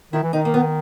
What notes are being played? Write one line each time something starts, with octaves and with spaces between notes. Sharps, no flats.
D#3 E4
E3
D#3 D#4
A#3
B3